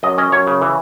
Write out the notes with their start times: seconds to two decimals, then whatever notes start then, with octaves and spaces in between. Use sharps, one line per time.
0.03 F#2 D#5
0.18 C#4 D#5
0.32 F#2 C#5
0.47 C#3
0.61 E3